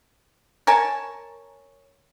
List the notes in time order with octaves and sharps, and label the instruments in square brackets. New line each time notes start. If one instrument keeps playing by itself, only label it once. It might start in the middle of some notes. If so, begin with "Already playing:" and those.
[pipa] A#4 C#5 G#5 A5